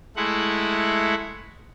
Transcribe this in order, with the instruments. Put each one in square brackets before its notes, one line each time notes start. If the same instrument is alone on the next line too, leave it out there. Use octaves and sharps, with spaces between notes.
[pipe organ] G#3 A3 E4 F#5